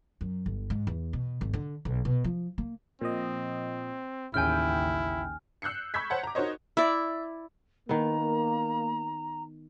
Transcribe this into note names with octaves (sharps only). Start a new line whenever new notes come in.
F#2
G1
G#2
E2
B2
G#1
D3
B1
B2
F3
A#3
A#2 F3 C4 D#5
A1 D#2 C#3 E4 G5 G#5 F6
E6 F#6 G6 C7 C#7
B5 C#6 E6 G6 G#6 B6
C5 C#5 F#5 A5
A#5 D6
D#4 F#4 A#4 C5 C#5 D#5
E4 D5 E5
D#3 A#3 B3 A#5